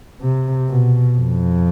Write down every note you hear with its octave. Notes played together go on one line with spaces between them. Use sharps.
C3
B2
F2